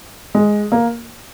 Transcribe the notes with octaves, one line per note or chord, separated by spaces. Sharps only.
G#3
A#3